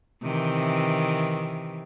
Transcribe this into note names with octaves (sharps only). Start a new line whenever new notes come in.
C3 D#3 E3